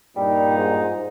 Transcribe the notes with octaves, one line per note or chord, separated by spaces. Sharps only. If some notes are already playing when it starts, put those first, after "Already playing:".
G2 A#2 G3 D#4
G#2